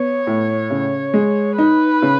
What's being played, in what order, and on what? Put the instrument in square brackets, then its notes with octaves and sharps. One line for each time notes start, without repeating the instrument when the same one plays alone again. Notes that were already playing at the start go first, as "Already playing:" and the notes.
Already playing: [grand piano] B3 [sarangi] C#5
[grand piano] A2
C#3
G#3
[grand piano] D#4 [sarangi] B4
[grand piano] C#3